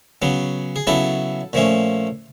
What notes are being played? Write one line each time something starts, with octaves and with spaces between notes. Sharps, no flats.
C#3 F#3 B3
G#4
C#3 F#3 B3 E4 A4
A#2 F3 A3 C#4